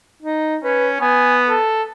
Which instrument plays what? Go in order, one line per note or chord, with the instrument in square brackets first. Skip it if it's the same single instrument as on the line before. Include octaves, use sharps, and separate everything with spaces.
[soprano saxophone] D#4
[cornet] C#4 [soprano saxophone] B4
[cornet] B3 [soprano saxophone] G#5
[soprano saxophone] A4